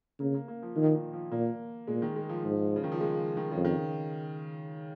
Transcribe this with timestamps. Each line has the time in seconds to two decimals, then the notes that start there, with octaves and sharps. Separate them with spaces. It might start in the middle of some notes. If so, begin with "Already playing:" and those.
0.20 C#3 A#3
0.34 A#3
0.48 A#3
0.62 F3
0.76 A#2 D#3
0.95 D#3
1.13 F3
1.31 A#2 A#3
1.87 A#2 G#3
2.02 D#3
2.16 G#3
2.29 F3
2.44 G#2
2.76 C#3
2.84 D#3
2.92 F3
3.00 G#3
3.37 D#3
3.51 F2 C#3
3.65 D#3